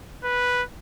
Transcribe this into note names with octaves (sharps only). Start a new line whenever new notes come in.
B4